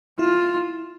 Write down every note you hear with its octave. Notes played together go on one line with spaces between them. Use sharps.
E4 F4